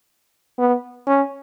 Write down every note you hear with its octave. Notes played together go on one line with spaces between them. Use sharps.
B3
C#4